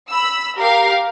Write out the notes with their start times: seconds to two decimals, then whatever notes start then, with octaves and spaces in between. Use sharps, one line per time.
0.10 B5 E6
0.58 G4 A#4 F5